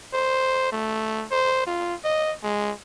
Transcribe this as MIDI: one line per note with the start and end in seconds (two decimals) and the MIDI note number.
0.14 0.72 72
0.72 1.25 57
1.31 1.64 72
1.67 1.95 65
2.04 2.33 75
2.43 2.72 56